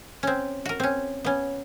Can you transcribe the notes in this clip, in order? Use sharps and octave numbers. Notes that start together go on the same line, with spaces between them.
C4 C#4
F#4 A#4
C4 C#4
B3 C#4